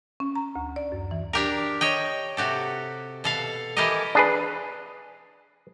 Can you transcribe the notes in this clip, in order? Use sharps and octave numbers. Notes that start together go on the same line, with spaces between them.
C#4
A#5
D2
D5
F#2
E3
D4 G4 A#4
C#5 D#5 G5
C3 F#4 G4 A4
B2 A4 F5
E3 E4 G4 A4 A#4 D#5
D4 G#4 B4